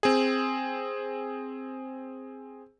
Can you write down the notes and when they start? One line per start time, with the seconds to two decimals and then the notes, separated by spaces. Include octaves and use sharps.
0.03 C4 G#4